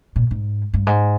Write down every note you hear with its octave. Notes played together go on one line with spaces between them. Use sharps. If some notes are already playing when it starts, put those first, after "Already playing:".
A#2
G#2
G2
G#2